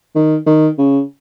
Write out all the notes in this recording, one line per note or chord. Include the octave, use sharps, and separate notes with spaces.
D#3
D#3
C#3